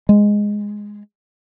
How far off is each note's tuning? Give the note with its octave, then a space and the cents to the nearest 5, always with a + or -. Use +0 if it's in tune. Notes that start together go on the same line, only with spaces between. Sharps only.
G#3 -5